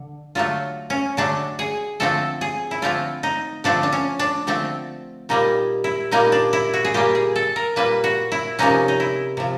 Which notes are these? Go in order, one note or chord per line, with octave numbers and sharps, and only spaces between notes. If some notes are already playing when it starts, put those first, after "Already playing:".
Already playing: D3
D3 F#3 A3 F4
C#4
D3 F#3 A3 D4
G#4
D3 F3 A3 C4 A4
G#4
E4
D3 F3 A3 C4 F4
D#4
D3 F3 A3 C4 D4
D4
C#4
D4
D3 F3 A3 C4
A#2 G3 A#3 D#4
E4
A#2 G3 A#3 D#4
D4
E4
F#4
G#4
A#2 G3 A#3 G4
G#4
A4
A#4
A#2 G3 A#3 B4
F#4
E4
C3 F3 A#3 C#4 D#4
D#4
E4
C3 F3